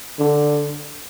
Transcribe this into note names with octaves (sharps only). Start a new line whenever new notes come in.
D3